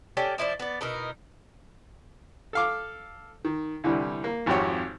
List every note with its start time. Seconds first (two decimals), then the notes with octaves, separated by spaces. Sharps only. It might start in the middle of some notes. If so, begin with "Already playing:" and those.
0.17 C#4 G4 A4 D5
0.38 F3 E4 C5 D5
0.60 B3 D5
0.81 B2 D#4 E4 A#4
2.53 A4 F5 D6
3.45 D#3
3.84 C2 D3 E3 G3
4.24 A#3
4.46 G#1 F2 F#4 G4 C#5